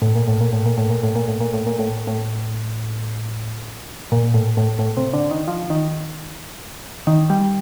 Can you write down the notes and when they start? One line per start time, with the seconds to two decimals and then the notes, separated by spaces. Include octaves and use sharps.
0.02 A2
0.15 A#2
0.28 A2
0.41 A#2
0.53 A2
0.66 A#2
0.78 A2
0.90 A#2
1.03 A2
1.15 A#2
1.28 A2
1.41 A#2
1.53 A2
1.66 A#2
1.79 A2
2.07 A2
4.12 A#2
4.34 A2
4.57 A2
4.79 A2
4.97 C3
5.13 D3
5.31 D#3
5.48 F3
5.70 D#3
7.07 D#3
7.30 G3